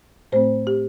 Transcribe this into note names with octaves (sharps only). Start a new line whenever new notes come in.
A2 A3 C4 C5
G4